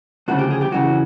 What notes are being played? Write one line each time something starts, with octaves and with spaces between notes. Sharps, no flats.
D2 C#3 F3 F#4
G4
G#4
G4
F#2 C#3 E3 F#4